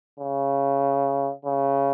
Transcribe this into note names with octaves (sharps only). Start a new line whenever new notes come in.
C#3
C#3